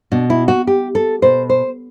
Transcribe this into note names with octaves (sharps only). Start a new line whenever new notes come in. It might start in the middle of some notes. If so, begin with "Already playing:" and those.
B2 D4
E4
F#4
G4
A4
B2 C5
C5